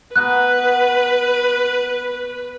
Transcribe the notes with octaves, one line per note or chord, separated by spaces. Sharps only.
B3 F#4 A#4 B4 F#6